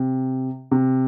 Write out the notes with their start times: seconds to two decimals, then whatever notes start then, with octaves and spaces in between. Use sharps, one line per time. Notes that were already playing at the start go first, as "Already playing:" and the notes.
Already playing: C3
0.71 C3